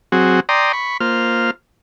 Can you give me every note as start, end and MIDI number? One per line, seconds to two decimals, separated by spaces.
0.12 0.40 54
0.12 0.40 60
0.12 0.40 66
0.12 0.40 68
0.49 0.72 74
0.49 0.72 79
0.49 0.72 82
0.49 0.72 84
0.49 0.72 87
0.73 0.97 83
0.73 0.97 85
1.00 1.51 58
1.00 1.51 65
1.00 1.51 72
1.00 1.51 89